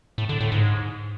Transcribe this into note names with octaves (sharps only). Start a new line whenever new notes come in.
A2
D3
A2
G#2